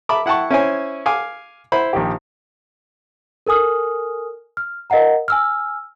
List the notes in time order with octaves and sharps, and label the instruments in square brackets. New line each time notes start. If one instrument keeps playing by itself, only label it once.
[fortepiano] E5 A5 B5 D6
E4 F#5 G5 A5 C#6
C#4 E4 C5 G#5
F5 G#5 D6
E4 C5 B5
A#1 D#3 G4
[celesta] A4 A#4 G#5 D#6 F6
F6
A#4 D#5 F5 F#5 A#5
G#5 E6 F6